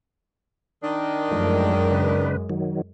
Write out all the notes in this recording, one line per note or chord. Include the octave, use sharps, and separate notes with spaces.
D#3 D4
F#2 F3 G#3 A3
C#3 B4
D#3 F#3